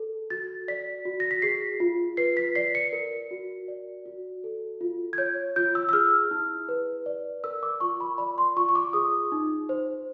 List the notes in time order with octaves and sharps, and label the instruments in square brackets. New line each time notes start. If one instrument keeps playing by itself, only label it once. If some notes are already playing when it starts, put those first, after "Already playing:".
Already playing: [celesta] A4
F#4 A6
D5 B6
F#4
A#6
B6
G#4 C7
F4
B4 C7
B6
D5 C7
C#7
A#4
F#4
D5
F#4
A4
F4
G#6
C#5 G6
F4 G6
E6
E6
G#4 F6
E4
B4
D5
A#4 E6
D6
F4 C#6
B5
D5 B5
C6
F4 C#6
C#6
D6
G#4 D#6
D#4
C5